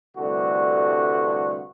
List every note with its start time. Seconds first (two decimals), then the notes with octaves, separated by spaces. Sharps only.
0.17 C2 G2 D3 A3 F#4